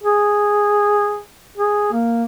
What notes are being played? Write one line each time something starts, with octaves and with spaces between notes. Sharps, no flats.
G#4
G#4
A#3